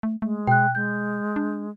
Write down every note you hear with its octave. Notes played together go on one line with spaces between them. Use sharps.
A3
G#3 A3
B2 G5 F#6
G#3 G6
D4